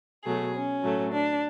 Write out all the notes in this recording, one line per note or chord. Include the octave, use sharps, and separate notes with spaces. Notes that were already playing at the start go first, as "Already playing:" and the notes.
B2 F#3 A3 G#4
C#4
A2 F#3 A3
D4